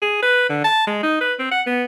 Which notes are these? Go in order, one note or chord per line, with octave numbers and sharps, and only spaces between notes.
G#4
B4
D3
A5
G#3
D#4
B4
C4
F#5
B3